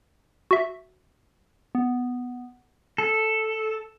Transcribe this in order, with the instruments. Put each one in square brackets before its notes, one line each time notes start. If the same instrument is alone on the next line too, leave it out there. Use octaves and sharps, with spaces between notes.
[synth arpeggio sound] F#4 E5
[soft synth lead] B3
[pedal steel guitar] A4